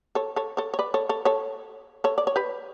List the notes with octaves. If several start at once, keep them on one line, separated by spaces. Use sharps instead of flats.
A4 C#5
A4 C#5
A4 C#5
C#5
B4 D5
A4 C#5
A4 C#5
A4 C#5
A4 C#5
D5
C#5
G4 B4